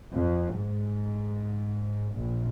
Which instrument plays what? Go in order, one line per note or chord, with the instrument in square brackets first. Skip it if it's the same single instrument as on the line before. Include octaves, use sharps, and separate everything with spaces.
[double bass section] F2
G#2
A#1